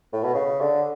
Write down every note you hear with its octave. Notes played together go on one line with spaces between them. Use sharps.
A2
B2
C#3
D3